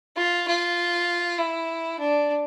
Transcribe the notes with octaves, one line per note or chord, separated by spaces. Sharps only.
F4
F4
E4
D4